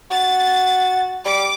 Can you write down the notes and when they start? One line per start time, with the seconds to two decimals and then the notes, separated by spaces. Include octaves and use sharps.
0.11 F#4 A6
1.25 G3 D6